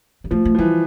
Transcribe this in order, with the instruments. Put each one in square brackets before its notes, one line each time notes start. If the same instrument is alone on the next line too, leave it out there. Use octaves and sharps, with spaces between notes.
[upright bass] G3
[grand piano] F3 [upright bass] A3
[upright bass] A3
[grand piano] F3
[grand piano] E3 [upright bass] G3